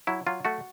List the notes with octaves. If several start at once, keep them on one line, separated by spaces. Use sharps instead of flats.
F#3 E4
F#3 F4
A3 F#4